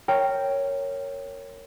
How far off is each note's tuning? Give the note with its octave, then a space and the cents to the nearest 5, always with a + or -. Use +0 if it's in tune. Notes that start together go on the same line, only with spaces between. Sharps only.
A#4 -15 C#5 +0 G5 +0